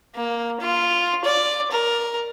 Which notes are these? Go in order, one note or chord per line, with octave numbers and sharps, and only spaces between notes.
A#3
F4
D5
A#4